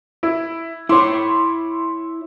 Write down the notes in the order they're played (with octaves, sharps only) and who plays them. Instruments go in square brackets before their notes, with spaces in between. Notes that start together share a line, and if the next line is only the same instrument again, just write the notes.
[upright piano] E4
[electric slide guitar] E4 C#5 [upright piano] C6 D6